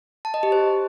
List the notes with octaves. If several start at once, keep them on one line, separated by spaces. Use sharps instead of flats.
A5
D#5
G4
C5